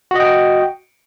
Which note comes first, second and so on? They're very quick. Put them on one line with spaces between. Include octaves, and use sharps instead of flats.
F#4 D#5 G5